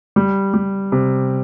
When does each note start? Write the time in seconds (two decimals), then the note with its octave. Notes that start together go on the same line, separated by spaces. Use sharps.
0.16 G3
0.54 G3
0.92 C3